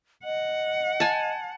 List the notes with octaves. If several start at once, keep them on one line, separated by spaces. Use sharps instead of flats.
D#5 F#5
G#5 A5